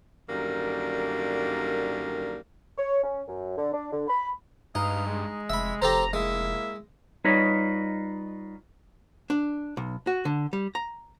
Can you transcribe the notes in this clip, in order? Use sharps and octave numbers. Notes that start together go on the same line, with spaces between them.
F#2 D3 D#3 G3 A#3
C#5
C#4
F#2
D3
D4
D3
B5
G2 G#3 D#4 B4 F5
G#3
F1 E5 B5
F1 G4 A4 C5 A#5
G#3 A#3 E4 E5
G3 D#4 F4 B4 C#5 D#5
D4
B1
F#4
D3
G3
A#5